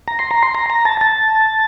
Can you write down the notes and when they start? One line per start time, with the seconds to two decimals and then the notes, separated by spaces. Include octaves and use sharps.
0.08 A#5
0.19 C6
0.31 A#5
0.43 C6
0.55 A#5
0.70 A#5
0.85 A5
1.01 A5